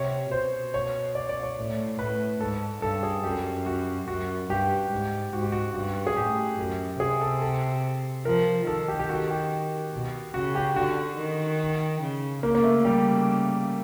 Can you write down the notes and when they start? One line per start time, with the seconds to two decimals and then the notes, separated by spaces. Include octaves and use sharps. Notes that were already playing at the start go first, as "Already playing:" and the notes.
Already playing: C3 C#5
0.31 B2 C5
0.74 C#5
1.15 D5
1.29 D5
1.43 C#5
1.56 A2
1.99 A2 B4
2.41 G#2 A4
2.82 G2 A4
3.03 G#4
3.24 F#2 G4
3.66 F#4
4.08 F#2 F#4
4.49 G2 G4
4.91 G#2
5.32 G#2 F#4
5.43 G4
5.52 F#4
5.74 G2 F#4
6.07 G#4
6.16 A2 G4
6.58 F#2
7.00 C3 G#4
7.21 A4
7.42 A4
8.25 F3 A#4
8.67 D#3 A4
8.88 G4
8.99 G4
9.09 F#4
9.30 G4
9.93 B2
10.34 C#3 F#4
10.55 G4
10.76 D3 F#4
11.17 D#3
12.01 C#3
12.43 C#3 A#3
12.55 A#3
12.64 A3
12.85 G3